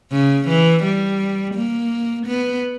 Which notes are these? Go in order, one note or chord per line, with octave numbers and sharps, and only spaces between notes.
C#3
E3
G3
A#3
B3